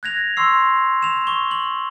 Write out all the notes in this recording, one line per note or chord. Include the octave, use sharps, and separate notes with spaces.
F#6 G#6 A#6 F7
C6 C#6 E6 C7
E7 F7
C#6 G7
F#7